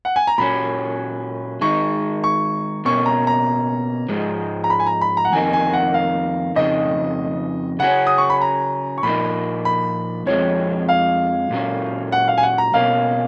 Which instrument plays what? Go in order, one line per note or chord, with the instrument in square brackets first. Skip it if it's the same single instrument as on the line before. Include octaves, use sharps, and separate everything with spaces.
[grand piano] F#5
G#5
A#5
[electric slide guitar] A#2 F#3 C#4 [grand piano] B5
[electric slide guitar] D#3 G#3 D#4 [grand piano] C#6
[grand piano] C#6
[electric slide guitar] B2 A#3 C#4 [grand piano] C#6
[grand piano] A#5
A#5
[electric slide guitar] G#2 F3 G#3
[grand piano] A#5
B5
G#5
A#5
B5
A#5
F#5
[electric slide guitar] F2 D#3 A#3 D#4 [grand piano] G#5
[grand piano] G#5
F#5
F5
[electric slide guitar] F2 C#3 D#4 [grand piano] D#5
[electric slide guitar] C#3 F#3 C#4 [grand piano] F#5
[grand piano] D#6
C#6
B5
A#5
C#6
[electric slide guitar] A#2 F3 A#3 D#4 [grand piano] B5
[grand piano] B5
[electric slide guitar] F2 F3 G#3 [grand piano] C#5
[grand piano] F5
[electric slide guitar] A#2 F#3 C#4
[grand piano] F#5
F5
G#5
F#5
A#5
[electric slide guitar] B2 A#3 C#4 [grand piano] F5